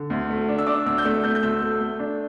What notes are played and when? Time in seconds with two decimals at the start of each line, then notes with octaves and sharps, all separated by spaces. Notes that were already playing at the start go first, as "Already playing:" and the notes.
Already playing: D3
0.10 D2
0.30 A3
0.49 D4
0.58 E6
0.67 D4 D6
0.86 D2 E6
0.98 G6
1.05 A3 E6
1.24 A3 G6
1.35 G6
1.43 D2 E6
1.62 A3
1.80 A3
1.99 D4